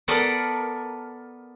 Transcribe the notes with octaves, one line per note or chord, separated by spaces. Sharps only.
B3 A4 A#4 D5